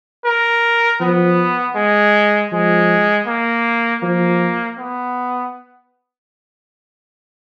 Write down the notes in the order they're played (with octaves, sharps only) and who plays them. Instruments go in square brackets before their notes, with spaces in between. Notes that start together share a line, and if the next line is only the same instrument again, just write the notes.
[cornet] A#4
[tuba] F3 [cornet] B3
[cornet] G#3
[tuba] F3 [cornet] G#3
[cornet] A#3
[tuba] F3 [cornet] A#3
[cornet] B3